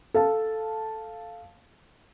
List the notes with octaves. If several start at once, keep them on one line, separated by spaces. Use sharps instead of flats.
A4 F5 A5